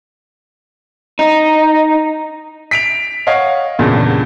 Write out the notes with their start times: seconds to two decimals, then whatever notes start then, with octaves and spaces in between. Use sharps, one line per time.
1.19 D#4
2.71 B6 D7 F7
3.27 C#5 D#5 F5 F#5
3.79 E2 G2 A#2 C#3